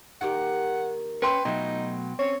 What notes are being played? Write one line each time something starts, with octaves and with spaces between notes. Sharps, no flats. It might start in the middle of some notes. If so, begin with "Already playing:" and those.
D#3 A#3 G4 F#5
C#4 B4 G5 C6
B2 F#3 A3 D#4 F4
C4 C#4 C#5